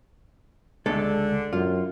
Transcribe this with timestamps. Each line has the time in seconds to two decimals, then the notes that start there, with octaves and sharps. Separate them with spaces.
0.86 C#2 D3 G#3 A4
1.53 F#2 F4